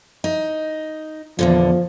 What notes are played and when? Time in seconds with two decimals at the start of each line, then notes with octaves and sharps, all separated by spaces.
0.24 D#4
1.39 E2 A#2 D3 F3